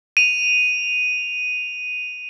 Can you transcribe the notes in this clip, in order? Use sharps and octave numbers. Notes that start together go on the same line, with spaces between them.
D#7 F7